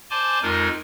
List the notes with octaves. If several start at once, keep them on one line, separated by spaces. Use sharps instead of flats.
C5 D5 G#5 A5 C6 D6
F2 G#3 D#4 F4 A#4